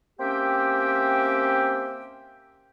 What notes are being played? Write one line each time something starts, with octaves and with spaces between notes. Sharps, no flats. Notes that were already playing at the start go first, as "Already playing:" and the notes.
A#3 C4 C#4 G4 E5 G5